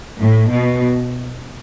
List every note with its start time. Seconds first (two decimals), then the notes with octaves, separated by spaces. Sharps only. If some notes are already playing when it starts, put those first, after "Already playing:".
0.19 A2
0.51 B2